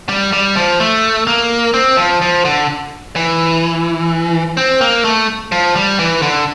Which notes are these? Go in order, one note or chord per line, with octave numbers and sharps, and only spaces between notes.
G3
G3
F3
A3
A#3
C4
F3
F3
D3
E3
C4
A#3
A3
F3
G3
E3
D3